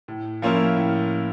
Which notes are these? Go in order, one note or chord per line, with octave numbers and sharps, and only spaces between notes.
A2
F3 A#3 C#4 E4
A2